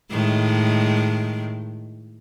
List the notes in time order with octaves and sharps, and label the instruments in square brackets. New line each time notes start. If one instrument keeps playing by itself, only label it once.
[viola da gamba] A2 D#3 G#3